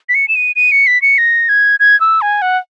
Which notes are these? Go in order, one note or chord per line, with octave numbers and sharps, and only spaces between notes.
B6
C#7
E7
D#7
D#7
C#7
B6
C#7
A#6
G#6
G#6
E6
G#5
F#5